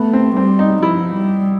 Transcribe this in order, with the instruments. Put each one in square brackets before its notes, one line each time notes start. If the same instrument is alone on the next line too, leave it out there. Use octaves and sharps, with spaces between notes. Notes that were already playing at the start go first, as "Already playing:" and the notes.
Already playing: [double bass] A3 [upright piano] B3
[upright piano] C4
[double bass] G3 [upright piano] C4
[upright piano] D#4
[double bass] F3 [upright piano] E4
[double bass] G3